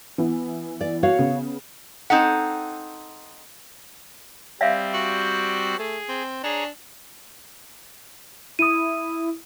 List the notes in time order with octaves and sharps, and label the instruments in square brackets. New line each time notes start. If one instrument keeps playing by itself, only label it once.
[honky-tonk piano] E3 B3 E4
[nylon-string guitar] D5
F#4 C#5 F5
[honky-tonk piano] C#3 B3
[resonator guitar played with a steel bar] C4 D#4 A4 F#5
[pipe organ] G3 C4 [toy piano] D5 E5 F5
[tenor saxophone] F#4
[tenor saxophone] A3 [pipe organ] G#4
[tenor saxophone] C4
[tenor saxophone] D4 [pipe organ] G#4 C#5 A#5
[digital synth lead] E4 [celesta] D#6 D#7